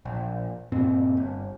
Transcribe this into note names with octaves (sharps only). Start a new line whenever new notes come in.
A#1
G2 A#2 C4
G1